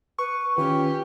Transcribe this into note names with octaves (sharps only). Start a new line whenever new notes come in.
B4 C#6
D#3 C#4 F4 G4 B4